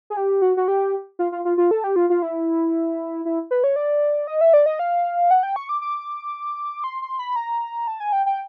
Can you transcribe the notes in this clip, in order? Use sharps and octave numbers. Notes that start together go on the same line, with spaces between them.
G#4
G4
F#4
F#4
G4
F4
F4
F4
F4
A4
G4
F4
F4
E4
E4
B4
C#5
D5
D#5
E5
D5
D#5
F5
F#5
G5
C#6
D6
D6
C6
C6
B5
A#5
A5
G#5
G5
G5